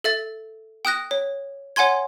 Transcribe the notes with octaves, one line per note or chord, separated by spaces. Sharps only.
A4 E5 A6
G5 D#6 F#6 A#6
C#5
C#5 F#5 G#5 C6 G#6